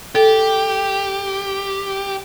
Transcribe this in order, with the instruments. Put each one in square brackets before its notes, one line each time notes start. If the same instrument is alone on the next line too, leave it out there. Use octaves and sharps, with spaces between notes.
[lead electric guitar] G4 [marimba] A4